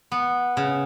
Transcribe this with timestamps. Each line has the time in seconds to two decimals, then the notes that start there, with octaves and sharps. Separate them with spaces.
0.12 B3
0.57 C#3